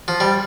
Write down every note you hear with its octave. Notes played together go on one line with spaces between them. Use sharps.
F3
G3